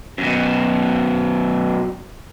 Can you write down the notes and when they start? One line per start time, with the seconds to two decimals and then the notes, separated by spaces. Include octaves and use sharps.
0.18 F#2 B2